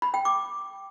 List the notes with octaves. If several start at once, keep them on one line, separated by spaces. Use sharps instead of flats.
B5
G5
D6